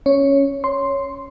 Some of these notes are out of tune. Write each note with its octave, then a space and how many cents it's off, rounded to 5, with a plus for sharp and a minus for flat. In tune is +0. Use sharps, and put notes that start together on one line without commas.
C#4 +0 C#5 +0
C#5 +0 C6 +0